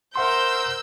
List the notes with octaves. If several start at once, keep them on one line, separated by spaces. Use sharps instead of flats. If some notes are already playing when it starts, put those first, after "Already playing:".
A#4 C5 E5 F#5 C6 E6 G6